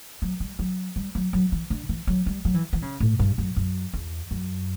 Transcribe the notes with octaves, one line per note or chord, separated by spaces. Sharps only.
F#3
G3
F#3
G3
F#3
F#3
E3
D3
E3
F#3
G3
F#3
E3
E3
C#3
A2
G2
F#2
F#2
E2
F#2